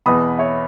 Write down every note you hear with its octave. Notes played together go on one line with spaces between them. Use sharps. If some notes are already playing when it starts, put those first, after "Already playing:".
E2 B2 B5 D#6
C#5 E5